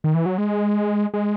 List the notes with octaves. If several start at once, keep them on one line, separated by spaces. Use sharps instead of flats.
D#3
E3
F#3
G#3
G#3